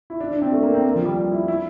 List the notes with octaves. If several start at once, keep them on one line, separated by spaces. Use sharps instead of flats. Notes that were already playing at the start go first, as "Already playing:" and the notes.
E4
D4
D4
C4
A3
A#3
C4
A#3
F3
G3
G3
E4
E4